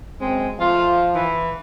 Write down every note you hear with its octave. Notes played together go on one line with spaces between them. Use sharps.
F#2 G#3 C4
F3 A3 F4
E3